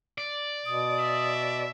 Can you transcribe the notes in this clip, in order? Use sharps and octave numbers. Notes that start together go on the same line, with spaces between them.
D5
B2 D#6
E5